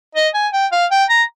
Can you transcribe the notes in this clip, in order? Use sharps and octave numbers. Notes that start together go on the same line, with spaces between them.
D#5
G#5
G5
F5
G5
A#5